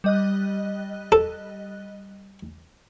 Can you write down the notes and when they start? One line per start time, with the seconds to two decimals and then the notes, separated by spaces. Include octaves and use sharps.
0.04 G3 D#5 F#6
1.12 A4